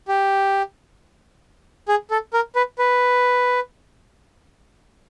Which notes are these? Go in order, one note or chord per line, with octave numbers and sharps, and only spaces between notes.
G4
G#4
A4
A#4
B4
B4